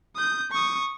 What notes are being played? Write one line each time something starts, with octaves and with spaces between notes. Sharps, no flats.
D#6 G6
C#6 D#6